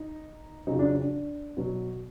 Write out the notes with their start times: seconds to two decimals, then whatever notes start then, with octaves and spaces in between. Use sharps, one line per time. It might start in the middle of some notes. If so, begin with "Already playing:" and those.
Already playing: D#4
0.67 F2 C#3 F#3 D#4
0.79 D4
1.01 D4
1.57 B2 F#3